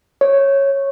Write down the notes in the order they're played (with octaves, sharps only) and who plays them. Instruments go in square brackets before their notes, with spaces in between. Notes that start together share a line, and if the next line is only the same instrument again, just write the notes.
[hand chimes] C#5